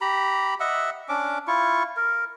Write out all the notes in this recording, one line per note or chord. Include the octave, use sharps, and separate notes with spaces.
G4 A#5 B5
D#5 E5 F#5
C#4 D4 D6
E4 F4 C#6
A#4